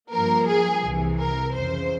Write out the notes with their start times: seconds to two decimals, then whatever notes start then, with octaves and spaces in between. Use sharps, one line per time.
0.11 G2 F3 A#3 A#4
0.48 G#4
0.83 C2 C3 E3
1.19 A#4
1.55 F2 C#3 E3 C5